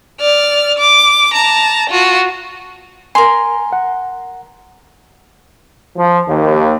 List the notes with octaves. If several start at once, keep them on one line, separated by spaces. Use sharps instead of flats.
D5 F6
D6
A5 A#5
F4 F#4
A#4 G#5 C6
F#5
F3
D#2